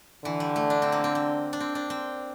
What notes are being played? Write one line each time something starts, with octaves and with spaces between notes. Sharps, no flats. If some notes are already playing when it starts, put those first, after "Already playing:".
D3 E3
G3
A3
D4
C4
A#3
C4
C4
D4
C4
D4
C4